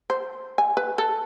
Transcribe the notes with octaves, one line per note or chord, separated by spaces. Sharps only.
C5
G#5
B4
A4